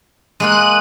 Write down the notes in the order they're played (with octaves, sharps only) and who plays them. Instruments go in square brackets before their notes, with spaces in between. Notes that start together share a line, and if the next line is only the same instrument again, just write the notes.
[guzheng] G#3 A#3 F4 [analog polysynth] F#6 D#7